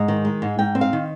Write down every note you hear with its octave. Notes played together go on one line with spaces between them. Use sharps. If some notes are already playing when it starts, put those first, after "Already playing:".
Already playing: G#2 D#5
D#3
G#3
G#2
G#2 G5
C4
F5
D#3